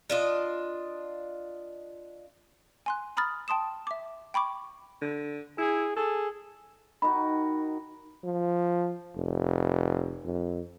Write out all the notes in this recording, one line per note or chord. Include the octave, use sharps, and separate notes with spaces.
D4 F4 D#5
G#5 C6 F#6
A#5 B5 D#6 F6 A6
G5 A5 C6 D#6 E7
E5 D6
G5 B5 C#6 D6
D3
E4 G#4
G#4 A4
D#3 D#4 F#4 B5
F3
F1
F2